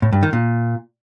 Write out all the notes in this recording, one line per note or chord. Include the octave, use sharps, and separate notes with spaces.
A2
G2
D#3
A#2